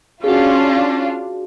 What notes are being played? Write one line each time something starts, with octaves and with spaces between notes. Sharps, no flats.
C#4 D4 F4 F#4 G#4